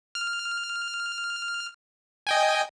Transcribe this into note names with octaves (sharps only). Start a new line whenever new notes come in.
F6
D#5 G5 G#5